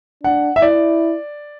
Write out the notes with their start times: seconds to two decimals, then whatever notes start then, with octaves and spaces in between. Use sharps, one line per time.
0.23 D4 F#5
0.56 E5
0.62 E4 D5